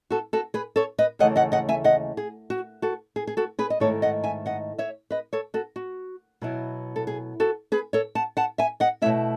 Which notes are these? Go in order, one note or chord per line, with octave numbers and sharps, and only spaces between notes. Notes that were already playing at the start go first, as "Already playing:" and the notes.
F#4 A4
F#4 A4
G#4 B4
A4 C#5
B4 D#5
D#2 C#3 E3 A3 D#5 F#5
D#5 F#5
D#5 F#5
E5 G#5
D#5 F#5
G#4
F#4
F#4 A4
G#4
G#4
F#4 A4
G#4 B4
D#5
G#2 D#3 A3 E4 A4 C#5
D#5 F#5
E5 G#5
D#5 F#5
C#5 E5
B4 D#5
A4 C#5
F#4 A4
F#4
B2 F#3 B3 E4
A4
G#4
F#4 A4
G#4 B4
A4 C#5
F#5 A5
F#5 A5
E5 G#5
D#5 F#5
B2 A3 E4 C#5 E5